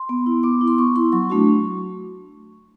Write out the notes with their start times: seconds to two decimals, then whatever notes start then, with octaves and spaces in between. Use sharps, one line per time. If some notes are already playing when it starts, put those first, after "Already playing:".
Already playing: C6
0.09 B3
0.26 E4
0.43 B3 D6
0.61 E4
0.68 C6
0.78 B3 C#6
0.96 E4 C6
1.12 F#3 C#6
1.30 A3 D4 F#4